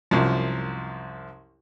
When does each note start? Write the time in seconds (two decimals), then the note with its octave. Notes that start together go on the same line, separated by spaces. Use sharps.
0.11 C2 F#2 F3